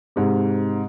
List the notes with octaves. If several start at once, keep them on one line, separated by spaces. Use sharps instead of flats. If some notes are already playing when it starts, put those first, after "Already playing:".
G#2 C3